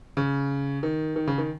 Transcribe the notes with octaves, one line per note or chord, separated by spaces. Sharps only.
C#3
D#3
D#3
C#3
D#3